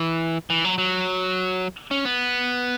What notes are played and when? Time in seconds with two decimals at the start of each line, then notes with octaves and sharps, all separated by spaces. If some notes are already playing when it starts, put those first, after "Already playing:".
Already playing: E3
0.50 E3
0.65 F#3
0.78 F#3
1.91 C#4
2.05 B3